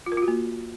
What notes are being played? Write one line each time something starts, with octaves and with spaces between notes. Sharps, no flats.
F4
A#4
F4
F#4
A#3